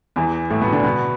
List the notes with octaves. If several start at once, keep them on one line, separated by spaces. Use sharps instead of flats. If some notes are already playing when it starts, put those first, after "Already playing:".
E2 E3
A2 A3
B2 B3
D3 D4
B2 B3